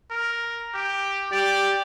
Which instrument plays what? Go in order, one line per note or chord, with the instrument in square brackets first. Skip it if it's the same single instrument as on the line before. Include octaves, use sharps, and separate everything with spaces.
[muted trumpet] A#4
G4
[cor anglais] G4 [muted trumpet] D5